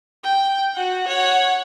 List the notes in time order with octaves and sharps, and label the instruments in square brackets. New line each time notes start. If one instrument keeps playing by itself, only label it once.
[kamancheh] G5
F#4 F#5
C#5 F#5